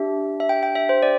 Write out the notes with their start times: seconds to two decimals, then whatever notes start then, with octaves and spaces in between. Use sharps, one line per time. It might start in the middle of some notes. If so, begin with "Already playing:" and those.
Already playing: D4 G4 E5
0.40 E5
0.49 G5
0.63 G5
0.75 E5
0.89 C5
1.03 D5